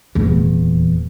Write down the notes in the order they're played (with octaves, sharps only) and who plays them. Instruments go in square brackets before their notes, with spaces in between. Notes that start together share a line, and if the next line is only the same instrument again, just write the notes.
[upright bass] D#1 E2